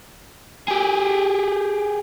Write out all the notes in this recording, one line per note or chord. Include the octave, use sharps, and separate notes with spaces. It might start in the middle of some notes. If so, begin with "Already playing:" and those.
G4 G#4